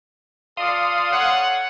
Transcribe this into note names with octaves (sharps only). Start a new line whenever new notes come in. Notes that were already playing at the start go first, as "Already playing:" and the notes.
F4 A4 D5 F5 C6 D#6
A4 C#5 F#5